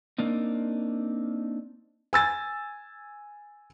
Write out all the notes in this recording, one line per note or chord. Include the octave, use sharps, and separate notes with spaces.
A#3 C4 D4 D#4
G#5 E6 A6